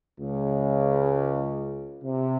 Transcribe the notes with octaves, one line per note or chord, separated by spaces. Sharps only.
C#2 C#3
C3